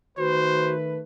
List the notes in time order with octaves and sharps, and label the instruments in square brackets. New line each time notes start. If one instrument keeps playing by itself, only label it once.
[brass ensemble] D#3 A3 B4 [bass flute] F#4 [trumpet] C5